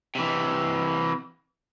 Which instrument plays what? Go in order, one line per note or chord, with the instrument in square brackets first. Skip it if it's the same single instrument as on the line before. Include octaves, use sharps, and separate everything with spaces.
[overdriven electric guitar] C3 E3